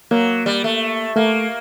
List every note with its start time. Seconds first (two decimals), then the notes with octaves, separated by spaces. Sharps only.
0.11 F#3 A#3
0.46 G3
0.64 A3
1.16 A3 A#3